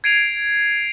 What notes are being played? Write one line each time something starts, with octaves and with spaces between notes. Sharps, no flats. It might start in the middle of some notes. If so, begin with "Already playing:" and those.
G#6 C7 D7 D#7 F7